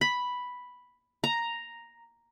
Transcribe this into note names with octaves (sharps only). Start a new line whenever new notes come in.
B5
A#5